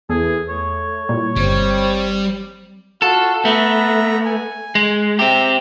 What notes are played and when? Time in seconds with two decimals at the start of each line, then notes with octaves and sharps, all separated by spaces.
0.10 E2 E3 G#4 A4
0.49 A3 C#5
1.09 A#2 G3 E4
1.36 G1 G3 C4
3.02 F4 F#4 A4
3.45 A3 B3 E5 A#5
4.25 G#5
4.75 G#3
5.19 C4 G4 E5 A#5